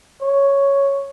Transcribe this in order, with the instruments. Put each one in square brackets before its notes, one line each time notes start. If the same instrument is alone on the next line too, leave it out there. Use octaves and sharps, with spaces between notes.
[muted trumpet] C#5